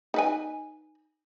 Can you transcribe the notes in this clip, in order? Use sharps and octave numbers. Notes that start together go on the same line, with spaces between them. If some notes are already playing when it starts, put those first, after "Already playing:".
D#4 B4 G#5